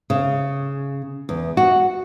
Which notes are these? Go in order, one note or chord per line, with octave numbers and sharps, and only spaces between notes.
C#3
E2
F#4